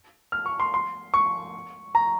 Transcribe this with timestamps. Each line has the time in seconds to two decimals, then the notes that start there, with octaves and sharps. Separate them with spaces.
0.32 F6
0.46 C#6
0.60 C6
0.74 C6
1.14 C#6
1.95 A#5